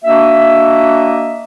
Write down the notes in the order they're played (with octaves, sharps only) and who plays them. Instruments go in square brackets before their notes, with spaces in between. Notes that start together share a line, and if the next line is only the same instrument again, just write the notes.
[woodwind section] A#3 D4 F#4 D#5 E5